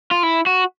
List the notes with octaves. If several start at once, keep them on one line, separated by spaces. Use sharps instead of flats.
F4
E4
F#4